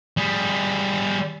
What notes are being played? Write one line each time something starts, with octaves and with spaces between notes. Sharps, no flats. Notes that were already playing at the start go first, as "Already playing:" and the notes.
G3 G#4